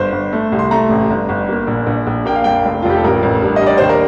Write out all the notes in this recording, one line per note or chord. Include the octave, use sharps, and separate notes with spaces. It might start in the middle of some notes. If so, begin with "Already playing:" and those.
Already playing: G1 C5
G1
A3
C2
C6
A3 A#5
A1
G1
G1
A#3
A#1
A#1
A#1
A#3 G5
F5
F2 G5
F1
F1 F4
G4
A4
A1 A#4
A1
G2
D#5
G2
D5
D#2 C5
A#4